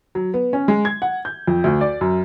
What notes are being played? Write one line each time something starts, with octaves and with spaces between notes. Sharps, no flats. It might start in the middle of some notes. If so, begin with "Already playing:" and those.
F#3
B3
C#4
G#3
G#6
F#5
G6
F2
D2
D5
F#2